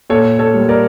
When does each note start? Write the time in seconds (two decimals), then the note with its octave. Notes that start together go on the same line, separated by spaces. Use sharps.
0.10 A#2 A4 C#5
0.39 A4 C#5
0.54 G3 A#3
0.69 A#4 D5